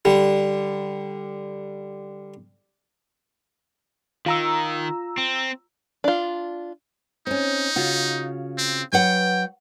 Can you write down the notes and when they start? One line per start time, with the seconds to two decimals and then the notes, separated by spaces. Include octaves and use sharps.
0.05 D3 G3
4.26 D#3 F4 A#5 E6
5.18 C4
6.04 D4 F4
7.27 C4 C#4 D#4
7.76 C#3 F4 F#4
8.58 C4
8.93 F#3 B4 F#5 G5